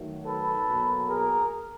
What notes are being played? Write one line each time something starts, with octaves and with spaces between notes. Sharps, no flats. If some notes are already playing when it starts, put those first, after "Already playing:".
Already playing: D#3 F#3 A3
A4 B4
B2 F#3 A#3
G#4 A#4